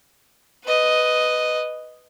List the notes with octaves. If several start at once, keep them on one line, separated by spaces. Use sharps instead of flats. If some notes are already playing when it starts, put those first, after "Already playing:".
B4 D#5